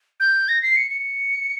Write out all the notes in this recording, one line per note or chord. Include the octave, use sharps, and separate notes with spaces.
G6
A#6
C7
C#7
C#7